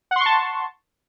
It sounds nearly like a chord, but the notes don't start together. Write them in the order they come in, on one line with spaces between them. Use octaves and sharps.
F#5 C6 C#6 A5